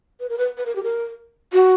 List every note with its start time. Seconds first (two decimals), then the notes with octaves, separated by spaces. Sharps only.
0.20 B4
0.29 A#4
0.38 B4
0.57 B4
0.66 A#4
0.75 G4
0.83 A#4
1.53 F#4